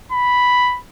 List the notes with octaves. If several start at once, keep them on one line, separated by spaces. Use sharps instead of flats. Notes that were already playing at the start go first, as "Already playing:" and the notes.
B5